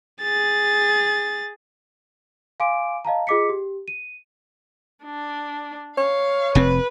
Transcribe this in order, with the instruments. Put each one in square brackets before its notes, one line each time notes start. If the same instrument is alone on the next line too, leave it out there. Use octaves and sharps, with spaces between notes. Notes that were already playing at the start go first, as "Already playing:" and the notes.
[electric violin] G#4 A6
[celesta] F5 G#5 C6 D6 D7
D#5 F5 A5 A#5
F4 G#4 D#5 D6 B6 C#7
G4
D#7
[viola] D4
[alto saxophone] C#5 [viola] F5
[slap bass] F1 C3 C4 [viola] B4